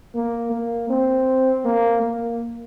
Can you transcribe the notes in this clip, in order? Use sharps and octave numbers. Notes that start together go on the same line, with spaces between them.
A#3
A#3
C4
A#3
A#3